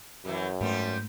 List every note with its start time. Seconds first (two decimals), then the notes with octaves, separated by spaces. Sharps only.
0.25 F#2 E3 F#3 G3
0.61 G#2 G3 A3 B3 C4